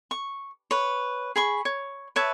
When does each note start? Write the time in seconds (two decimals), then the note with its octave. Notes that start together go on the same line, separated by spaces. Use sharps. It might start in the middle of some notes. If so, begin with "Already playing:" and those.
0.11 C#6
0.71 B4 C#5
1.36 G#4 B5 C#6
1.65 C#5
2.16 B4 C#5 E5 A5